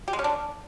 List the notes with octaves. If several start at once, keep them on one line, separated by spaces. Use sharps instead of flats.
G4
G#3
C#4
D4